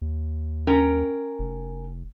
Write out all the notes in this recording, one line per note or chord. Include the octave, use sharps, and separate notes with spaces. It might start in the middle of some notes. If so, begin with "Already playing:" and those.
D#2
C#4 A#4 G5
F1